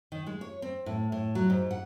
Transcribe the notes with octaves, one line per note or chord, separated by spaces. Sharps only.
D#3
G#3
C#5
C4
A2
A2
F#3
G#2
F#5